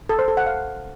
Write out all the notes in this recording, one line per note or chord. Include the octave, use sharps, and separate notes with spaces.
A4
C5
A4
F#5
F5